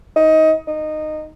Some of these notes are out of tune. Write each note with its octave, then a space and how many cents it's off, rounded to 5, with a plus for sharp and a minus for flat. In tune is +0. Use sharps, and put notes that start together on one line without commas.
D#4 +20
D#4 -15